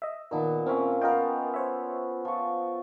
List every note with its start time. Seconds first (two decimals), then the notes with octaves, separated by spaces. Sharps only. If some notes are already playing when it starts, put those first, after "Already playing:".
0.02 D#5 E5
0.31 A#2 D#3 B3 D#4 A#4 A5
0.66 C4 C#4 F4 A#4 E5
1.01 B3 F4 A#4 D#5 G5
1.54 C5 C#5 E5
2.25 F3 C#6